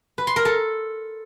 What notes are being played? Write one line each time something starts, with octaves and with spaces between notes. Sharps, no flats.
B4
C6
A#4
A4